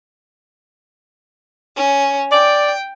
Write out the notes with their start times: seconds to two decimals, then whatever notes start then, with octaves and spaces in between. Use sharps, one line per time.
1.76 C#4
2.32 D5 G5